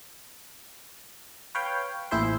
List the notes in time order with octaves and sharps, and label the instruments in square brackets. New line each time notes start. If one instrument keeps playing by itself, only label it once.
[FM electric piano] B4 C#5 F5 G5
A1 A#2 E4 G#4 C5 C6